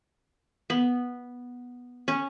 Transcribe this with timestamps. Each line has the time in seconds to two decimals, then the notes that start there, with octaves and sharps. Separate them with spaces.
0.70 B3
2.08 C#4